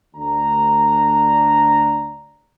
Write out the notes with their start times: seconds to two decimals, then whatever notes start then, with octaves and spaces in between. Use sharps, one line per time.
0.15 D2 D4 A#5